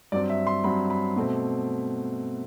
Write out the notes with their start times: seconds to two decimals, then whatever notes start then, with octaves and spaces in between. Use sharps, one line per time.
0.12 G2 F#3 C4 D5
0.29 E5
0.47 C6
0.64 G2 F#3 C4 B5
0.90 B5
1.16 B2 A3 C4